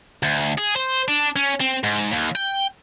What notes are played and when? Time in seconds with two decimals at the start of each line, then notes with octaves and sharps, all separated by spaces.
0.23 D2
0.58 G#4
0.76 C5
1.08 D4
1.36 C#4
1.60 C4
1.84 G#2
2.12 D#2
2.35 G5